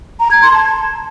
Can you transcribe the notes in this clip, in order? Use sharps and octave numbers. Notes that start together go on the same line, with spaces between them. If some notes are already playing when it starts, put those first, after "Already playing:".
A#5
G#6
C6
A5